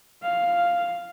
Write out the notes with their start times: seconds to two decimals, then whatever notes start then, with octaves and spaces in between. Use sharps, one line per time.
0.23 F5